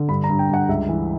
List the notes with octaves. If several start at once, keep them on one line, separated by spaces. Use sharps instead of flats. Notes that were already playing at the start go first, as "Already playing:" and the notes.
Already playing: D3
G2 B5
A#5
G2
G5
G2 F#5
C#2 E5
E3